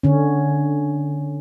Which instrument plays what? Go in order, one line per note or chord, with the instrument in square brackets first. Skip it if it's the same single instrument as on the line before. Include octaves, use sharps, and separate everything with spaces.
[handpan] D3 C#4